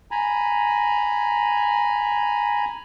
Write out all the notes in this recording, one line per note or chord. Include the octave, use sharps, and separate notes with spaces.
G#5 A#5 B5